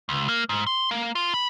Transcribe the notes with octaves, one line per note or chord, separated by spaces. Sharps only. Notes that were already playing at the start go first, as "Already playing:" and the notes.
C#2
A#3
G#2
C6
A#3
F4
B5